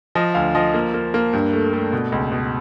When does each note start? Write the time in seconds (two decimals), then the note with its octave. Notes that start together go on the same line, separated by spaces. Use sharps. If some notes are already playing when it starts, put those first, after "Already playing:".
0.15 F3 D#5
0.35 D2 F5
0.55 F3 D#5
0.74 A#3
0.94 A#3
1.14 A#3
1.33 G2
1.53 A3
1.73 A3
1.93 B2
2.12 C#2
2.32 B2